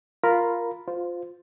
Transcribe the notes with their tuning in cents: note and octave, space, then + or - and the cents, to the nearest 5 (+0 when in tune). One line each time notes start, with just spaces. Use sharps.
F4 +0 A#4 +0 B5 +0
F4 +10 C5 -15